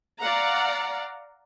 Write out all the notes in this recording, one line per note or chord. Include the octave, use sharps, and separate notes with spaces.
D5 F5 F#5 A#5